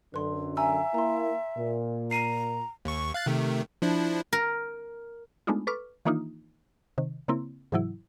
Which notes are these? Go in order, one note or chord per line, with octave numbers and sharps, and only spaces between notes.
F#2 D3 B4 C6
E5 G#5 A#5 E6
A#3 E4 A#5 C6
A#2
A#5 C7 D#7
D#2 C#6
F5 F#6 A6
C3 D#3 A3
F3 D4 E4
A#4
G#3 A3 B3 D4 D#4 F4
A4 B4 C#6 D6 F6
D#3 E3 A#3 D4 D#4 F4
C3 D#3
C#3 A#3 C4 E4
G#2 C3 E3 F#3 E4